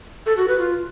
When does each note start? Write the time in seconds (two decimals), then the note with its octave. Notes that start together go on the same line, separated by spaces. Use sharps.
0.26 A4
0.37 F#4
0.48 B4
0.59 F4